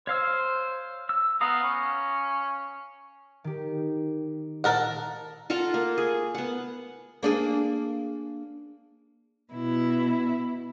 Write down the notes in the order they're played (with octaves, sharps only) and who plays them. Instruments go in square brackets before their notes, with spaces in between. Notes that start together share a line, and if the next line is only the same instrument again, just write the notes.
[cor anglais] C5 [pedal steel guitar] C#5 F5 E6
[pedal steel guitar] E6
[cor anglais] B3 [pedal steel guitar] F5 A#5 D#6
[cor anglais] C#4
[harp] D#3 G4
[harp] A#2 [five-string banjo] A4 A#4 F#5
[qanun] F4 A4 F#5 A#5
A#3
G#4
B3 F#5
[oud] A#3 D4 G#4
[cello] B2 E4